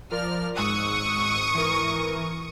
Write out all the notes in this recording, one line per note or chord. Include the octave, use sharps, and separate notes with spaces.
F3 A#4 D5 F6
G#1 G#2 C#6 D#6 E6 F#6
E3 A#4